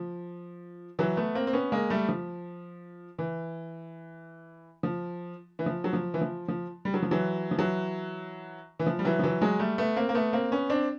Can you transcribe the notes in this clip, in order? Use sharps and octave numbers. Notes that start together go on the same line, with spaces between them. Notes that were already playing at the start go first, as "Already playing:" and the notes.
Already playing: F3
E3 F#3
A3 B3
A#3 C4
C4
B3 C#4
G#3 A#3
G3 A3
F3
E3
F3
E3
F3
F#3
F3
E3
F3
F3
G3
F#3
F3
E3 F#3
F3
E3 F#3
E3
F3
G3
E3 F#3
F3
E3 F#3
F#3 G#3
G3 A3
A3 B3
A#3 C4
A#3
A3 B3
A#3 C4
B3 C#4
C4 D4